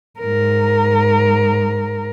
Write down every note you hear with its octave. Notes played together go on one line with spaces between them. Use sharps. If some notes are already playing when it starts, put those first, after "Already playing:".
G#2 A#4